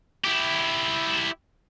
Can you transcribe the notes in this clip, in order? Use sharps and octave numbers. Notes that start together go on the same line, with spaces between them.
E4 G4